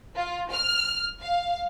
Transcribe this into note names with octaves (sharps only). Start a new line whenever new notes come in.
F4
F6
F5